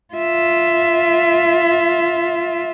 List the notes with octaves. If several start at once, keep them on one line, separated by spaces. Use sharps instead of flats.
F4 E5